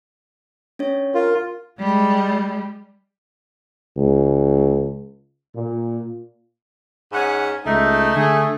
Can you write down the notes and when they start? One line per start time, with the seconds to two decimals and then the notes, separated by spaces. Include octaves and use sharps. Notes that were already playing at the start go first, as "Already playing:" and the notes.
0.79 C#4 D4 C#5
1.15 F4 A#4
1.79 G3 G#3
3.97 C#2
5.56 A#2
7.13 G#2 C#4 F#5
7.66 C#2 A3 D#4
8.16 D3 G#4